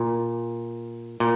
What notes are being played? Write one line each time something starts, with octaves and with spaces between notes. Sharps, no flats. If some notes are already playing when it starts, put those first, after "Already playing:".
Already playing: A#2
A#2